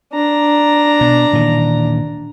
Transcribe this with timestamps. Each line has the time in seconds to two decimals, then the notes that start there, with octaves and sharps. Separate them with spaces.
0.13 D4 A#5
1.01 B2
1.33 A#2 D#3 E3